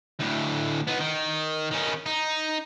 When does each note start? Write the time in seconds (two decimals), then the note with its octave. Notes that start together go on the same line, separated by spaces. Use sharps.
0.20 D2 A2
0.87 B3 D#4
1.00 D#3
1.71 D#3 C#4
2.06 D#4